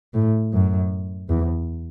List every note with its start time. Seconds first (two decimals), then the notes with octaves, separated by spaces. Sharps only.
0.14 A2
0.53 F#2
1.29 E2